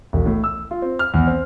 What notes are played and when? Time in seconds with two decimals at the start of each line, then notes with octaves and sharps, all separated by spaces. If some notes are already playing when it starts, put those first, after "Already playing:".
0.13 E1
0.26 A2
0.44 E6
0.71 F4
0.82 C4
0.99 F6
1.14 E2
1.27 C4